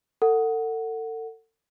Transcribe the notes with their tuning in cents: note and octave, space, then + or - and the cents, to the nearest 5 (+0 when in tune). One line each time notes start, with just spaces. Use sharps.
A4 +35 F#5 +0